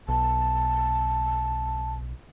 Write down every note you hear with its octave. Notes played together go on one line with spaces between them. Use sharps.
B1 A5